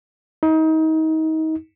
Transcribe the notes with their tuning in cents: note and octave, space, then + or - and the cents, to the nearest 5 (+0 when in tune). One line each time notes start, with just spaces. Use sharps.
D#4 +30